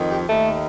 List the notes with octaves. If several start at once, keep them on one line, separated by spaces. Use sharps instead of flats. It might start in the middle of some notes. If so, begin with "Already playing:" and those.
Already playing: F2 D#3
G4
D#2 D#3 A3